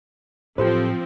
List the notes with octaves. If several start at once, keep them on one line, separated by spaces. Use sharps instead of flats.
A2 F3 F#3 C4 G4 A4 B4 C5